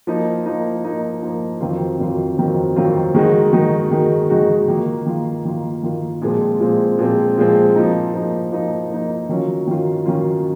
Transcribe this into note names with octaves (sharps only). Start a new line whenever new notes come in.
F3 A#3 D#4
F3 A#3 D#4
F3 A#3 D#4
F3 A#3 D#4
F2 D#3 F#3 C4 F4
F2 D#3 F#3 C4 F4
F2 D#3 F#3 C4 F4
F2 D#3 F#3 C4 F4
D#3 G#3 D#4 F#4
D#3 G#3 D#4 F#4
D#3 G#3 D#4 F#4
D#3 G#3 D#4 F#4
D#3 A#3 F4
D#3 A#3 F4
D#3 A#3 F4
D#3 A#3 F4
A#2 F3 G#3 C4
A#2 F3 G#3 C4
A#2 F3 G#3 C4
A#2 F3 G#3 C4
F3 A#3 D#4
F3 A#3 D#4
F3 A#3 D#4
F3 A#3 D#4
D#3 F#3 C#4 F4
D#3 F#3 C#4 F4
D#3 F#3 C#4 F4